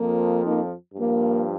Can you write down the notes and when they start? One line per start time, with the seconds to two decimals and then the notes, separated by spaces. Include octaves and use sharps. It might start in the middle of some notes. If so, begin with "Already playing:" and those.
Already playing: F2 F3 A#3
0.43 A#3 D#4
0.95 G2 F3 A#3